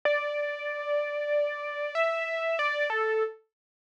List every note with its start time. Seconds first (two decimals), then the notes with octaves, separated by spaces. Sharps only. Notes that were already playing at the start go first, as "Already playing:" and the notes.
0.05 D5
1.95 E5
2.59 D5
2.90 A4